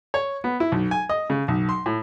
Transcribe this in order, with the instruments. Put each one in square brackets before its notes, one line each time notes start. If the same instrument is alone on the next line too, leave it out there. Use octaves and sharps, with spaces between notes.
[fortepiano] C#5
B3
E4
B1
G#5
D#5
C#3
B1
C6
A2